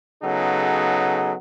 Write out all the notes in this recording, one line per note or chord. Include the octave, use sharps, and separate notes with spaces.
C#3 F#3 B3 D#4 G#4 A4